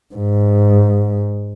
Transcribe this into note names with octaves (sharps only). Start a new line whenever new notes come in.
G#2